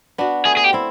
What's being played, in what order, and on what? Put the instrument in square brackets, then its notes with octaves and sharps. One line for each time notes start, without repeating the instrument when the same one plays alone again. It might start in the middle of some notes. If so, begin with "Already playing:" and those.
[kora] B3 D4 F#4
[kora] A3 [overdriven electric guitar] G#4
[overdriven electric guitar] G#4
G4
[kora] C4 E4